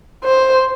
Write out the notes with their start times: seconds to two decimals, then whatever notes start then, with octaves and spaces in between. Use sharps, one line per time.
0.25 C5